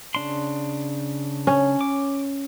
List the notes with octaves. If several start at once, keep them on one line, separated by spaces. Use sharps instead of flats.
C#3 D4 C6
C#4
D6